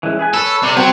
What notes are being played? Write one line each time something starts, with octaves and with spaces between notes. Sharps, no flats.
E3 G#3 C#4
G#4 B4 G#5
A4 B4 C#5
C3 A4 D5
F#3 B3 C4 C5